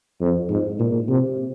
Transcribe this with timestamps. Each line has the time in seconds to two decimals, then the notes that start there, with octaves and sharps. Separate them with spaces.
0.20 F2
0.49 G#2
0.79 A#2
1.08 C3